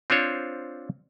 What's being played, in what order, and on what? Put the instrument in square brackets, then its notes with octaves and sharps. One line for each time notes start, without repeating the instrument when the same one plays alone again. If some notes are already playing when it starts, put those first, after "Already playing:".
[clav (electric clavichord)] C4 D4 F4 C5 C#5